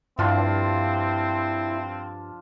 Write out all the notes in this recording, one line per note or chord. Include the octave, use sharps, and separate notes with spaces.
G2 F3 C4 D4 E4 F4